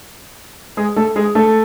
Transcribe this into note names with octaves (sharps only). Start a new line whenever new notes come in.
G#3 G#4
A3 A4
G#3 G#4
A3 A4